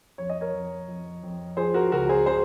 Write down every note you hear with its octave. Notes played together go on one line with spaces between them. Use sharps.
F2 C#5
D#5
A#4 C#5
F2
F2
F2
F3 G#4 C5
F#4 A#4
C#2 F#4 A#4
G#4 C5
C#3 G#4 C5